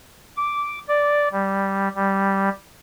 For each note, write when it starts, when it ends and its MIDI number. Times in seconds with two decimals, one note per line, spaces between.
0.37 0.79 86
0.88 1.29 74
1.32 1.89 55
1.96 2.49 55